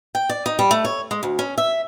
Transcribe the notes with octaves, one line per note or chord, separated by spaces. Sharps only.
G5
D5
D#4
G3
A3
C#5
G#3
D2
C#4
E5